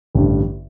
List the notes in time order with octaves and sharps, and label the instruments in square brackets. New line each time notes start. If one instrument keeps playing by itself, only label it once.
[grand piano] A1 G2 D3